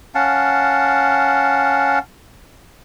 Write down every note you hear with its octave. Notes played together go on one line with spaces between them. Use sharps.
C#4 F5 F#5 A5